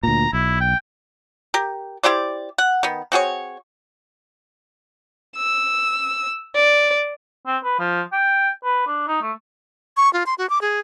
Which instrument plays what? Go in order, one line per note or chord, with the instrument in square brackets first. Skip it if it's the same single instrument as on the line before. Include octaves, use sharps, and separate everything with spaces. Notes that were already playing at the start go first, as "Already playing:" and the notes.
[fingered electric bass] D2 A#2 [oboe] A#5
[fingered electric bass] B1 [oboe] E4
[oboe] G5
[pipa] G4 A#4
E4 G4 C5 D5
F#5
D#3 B3
C4 F#4 G#4 C#5
[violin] E6
D5
[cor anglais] C4
B4
F3
G5
B4
D4
D#4
A3
[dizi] C#6
F4
C6
F#4
D6
G#4